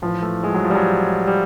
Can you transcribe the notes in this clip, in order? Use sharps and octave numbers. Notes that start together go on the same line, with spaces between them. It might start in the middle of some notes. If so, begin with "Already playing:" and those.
A2 E3 F3
A3
G#3
F3
F#3
F3
G3
F#3
G3